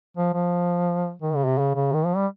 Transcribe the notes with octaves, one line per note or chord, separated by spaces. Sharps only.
F3
F3
D#3
C#3
C3
C#3
C#3
D#3
F3
G3